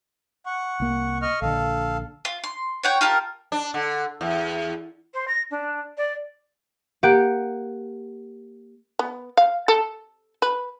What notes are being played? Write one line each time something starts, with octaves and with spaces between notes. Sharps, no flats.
F#5 C#6
C2 A#3
D#5 C#6 F6
A#1 D3 A4 F5
F4
C6
C#5 F#5 G5
F4 G4 A#4 A5
D4
D3
E2
C5
A#6
D4
D5
A#3 G4 F#5 D7
B3
F5
A4
B4